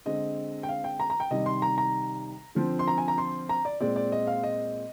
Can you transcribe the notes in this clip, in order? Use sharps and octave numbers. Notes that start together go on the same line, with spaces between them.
D3 G#3 C4 D#5
G5
F5
G5
A#5
A#5
G5
C3 D#3 G3 D#5
C6
A#5
A#5
D3 F3 C4
C6
A#5
G#5
A#5
C6
A#5
D5
A#2 G#3 C4 D5
D5
D#5
F5
D#5